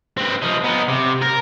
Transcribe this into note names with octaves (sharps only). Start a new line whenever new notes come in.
C4 B4
F3 D#4
B3 D#4
C3
A#4